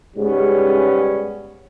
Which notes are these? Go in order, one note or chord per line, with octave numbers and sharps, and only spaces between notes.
G#2 C#3 G3 B3 C#4